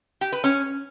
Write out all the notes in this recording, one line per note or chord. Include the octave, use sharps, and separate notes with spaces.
G4
B4
C#4